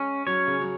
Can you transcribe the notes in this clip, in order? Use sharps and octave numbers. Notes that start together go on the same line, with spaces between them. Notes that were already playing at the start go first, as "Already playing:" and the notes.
Already playing: G#3 C#4
F#3 C#5
C#3
F#3